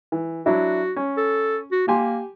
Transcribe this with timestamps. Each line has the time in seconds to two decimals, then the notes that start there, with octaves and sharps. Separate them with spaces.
0.12 E3
0.46 F#3 D4 E4 F#4
0.96 C#4
1.17 A4
1.72 F#4
1.88 A#3 G4 G#5 C6